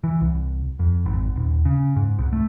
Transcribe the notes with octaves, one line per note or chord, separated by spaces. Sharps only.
E3
C2
F2
G#1
D#1
C#3
G#2
C2
A3